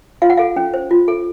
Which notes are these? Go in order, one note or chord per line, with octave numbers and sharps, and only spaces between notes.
F4 F5
F#5
A4 F5
C#4
C5
F4
A4